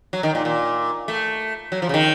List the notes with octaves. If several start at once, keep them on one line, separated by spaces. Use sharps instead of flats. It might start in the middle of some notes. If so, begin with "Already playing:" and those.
F#3
D#3
A#2
A#2
A3
F#3
F3
C#3
D#3